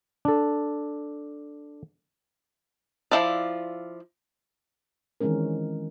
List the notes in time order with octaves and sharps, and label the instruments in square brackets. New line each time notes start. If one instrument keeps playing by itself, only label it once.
[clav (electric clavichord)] D4 A4
[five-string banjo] F3 E4 F4 D5
[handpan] D#3 E3 G#3 C4 C#4 A#4